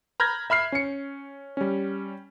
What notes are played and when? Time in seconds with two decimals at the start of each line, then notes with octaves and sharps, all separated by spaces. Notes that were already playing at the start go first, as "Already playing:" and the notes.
0.20 A#5 B5 F6 G6 G#6 A#6
0.50 E5 B5 F6 C7
0.72 C#4 C#7
1.57 G3 C#4